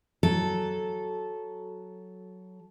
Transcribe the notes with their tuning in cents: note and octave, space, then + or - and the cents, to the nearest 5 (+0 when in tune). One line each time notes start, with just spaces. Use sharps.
F#3 +0 A4 -10